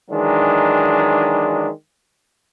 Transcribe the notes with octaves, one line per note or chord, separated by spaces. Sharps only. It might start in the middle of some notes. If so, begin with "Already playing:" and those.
D#3 E3 F#3 G#3 D4